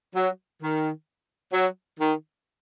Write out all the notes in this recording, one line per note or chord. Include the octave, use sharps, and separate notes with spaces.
F#3
D#3
F#3
D#3